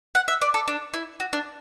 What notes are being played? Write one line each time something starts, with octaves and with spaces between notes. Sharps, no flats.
F#5
E5
D5
A4
D4
E4
F#4
D4